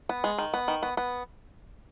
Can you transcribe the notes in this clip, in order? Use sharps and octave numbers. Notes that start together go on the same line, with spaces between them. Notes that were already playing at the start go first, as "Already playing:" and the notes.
B3
G#3
D#3
B3
D#3
B3
B3